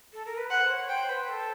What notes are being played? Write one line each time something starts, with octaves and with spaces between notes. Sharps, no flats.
A4
A#4
B4
C5 F#5
C#5
C5 G5
B4
A4